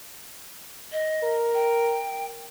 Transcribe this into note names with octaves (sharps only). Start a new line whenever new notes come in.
D#5
A#4
G5